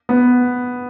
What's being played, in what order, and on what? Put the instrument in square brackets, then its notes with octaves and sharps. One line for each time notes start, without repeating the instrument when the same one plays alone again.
[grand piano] B3